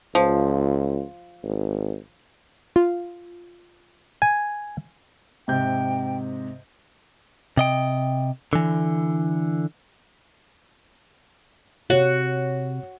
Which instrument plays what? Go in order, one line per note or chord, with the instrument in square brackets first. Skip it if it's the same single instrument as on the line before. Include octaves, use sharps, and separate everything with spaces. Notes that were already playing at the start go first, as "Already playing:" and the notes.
[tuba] C#2 [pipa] F3
[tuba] G#1
[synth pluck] F4
[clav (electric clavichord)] G#5
[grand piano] G#2 C3 G6 [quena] G5
[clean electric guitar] C3 D#5 G5
D3 E3
[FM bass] C3 [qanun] F#4 [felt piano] C#5